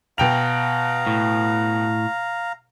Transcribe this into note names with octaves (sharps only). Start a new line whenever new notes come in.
B2 F5 G5 A#5 F7
A2